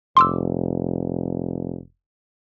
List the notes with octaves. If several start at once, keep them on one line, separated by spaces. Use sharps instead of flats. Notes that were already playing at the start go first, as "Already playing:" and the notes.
F1 C6 D6 E6